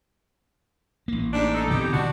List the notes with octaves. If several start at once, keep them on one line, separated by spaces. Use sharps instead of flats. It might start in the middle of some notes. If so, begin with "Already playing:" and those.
A1 A#3
G#2 G3 D4
D#4 A4
B2 D3 E3 C4 D#4 G4
D#1 D3 E3 D4 F#4